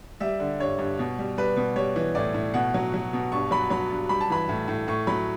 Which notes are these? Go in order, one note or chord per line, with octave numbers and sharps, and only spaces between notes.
G3 E5
D3
G2 C#5
G2
B2
G3
G3 B4
B2
G3 C#5
E3
A2 D5
A2
B2 F#5
F#3
F#3
B2
G2 C#6
F#3 B5
F#3 B5
G2
G3 B5
A5
E3 B5
A2
A2
A2 C#6
F#3 B5